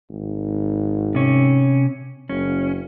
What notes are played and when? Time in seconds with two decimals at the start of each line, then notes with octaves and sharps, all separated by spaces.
0.10 G#1
1.15 C3 C#4
2.29 F#1 C#4